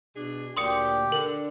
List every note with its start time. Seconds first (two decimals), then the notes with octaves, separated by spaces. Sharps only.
0.16 B2 D4 G#4
0.57 D2 A#2 G4 C6 D#6 C#7
1.12 D3 A#4